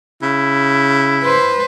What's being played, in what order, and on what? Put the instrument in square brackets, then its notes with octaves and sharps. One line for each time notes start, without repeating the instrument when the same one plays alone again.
[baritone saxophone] C#3 [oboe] E4
[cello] B4 C5